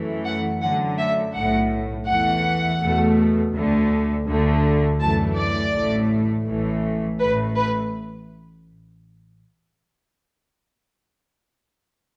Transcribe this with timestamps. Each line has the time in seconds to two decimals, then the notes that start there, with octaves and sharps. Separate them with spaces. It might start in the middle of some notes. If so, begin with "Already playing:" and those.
Already playing: F#2 E3 A3
0.25 F#5
0.61 F#2 D3 F#3 A3 F#5
0.98 E5
1.34 B1 A2 A3 F#5
2.07 E2 E3 A3 F#5
2.80 E2 B2 A3
3.53 D2 D3 A3
4.26 D2 D3 A3
4.99 F#2 E3 A3 A5
5.36 D5
5.73 A1 A2 A3
6.45 A1 A2 E3 A3
7.18 A1 A2 A3 B4
7.55 B4